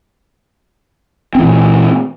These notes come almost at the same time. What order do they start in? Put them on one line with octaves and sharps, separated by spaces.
C4 E3 A#2